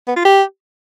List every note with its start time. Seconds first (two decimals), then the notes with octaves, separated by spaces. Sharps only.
0.08 B3
0.16 F4
0.25 G4